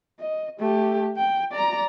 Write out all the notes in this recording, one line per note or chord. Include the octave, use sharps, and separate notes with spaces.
D#5
A3 G4
G5
D5 A#5